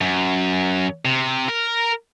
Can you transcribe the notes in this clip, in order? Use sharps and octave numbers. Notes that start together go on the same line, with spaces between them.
F#2
C3
A#4